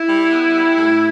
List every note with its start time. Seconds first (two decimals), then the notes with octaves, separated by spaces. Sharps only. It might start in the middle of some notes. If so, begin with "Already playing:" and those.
Already playing: E4
0.09 G3
0.32 B3
0.55 G3
0.77 A2